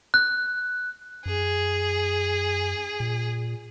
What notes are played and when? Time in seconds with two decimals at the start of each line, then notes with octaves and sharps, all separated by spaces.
0.14 F#6
1.26 F#2 G#4
3.00 A#2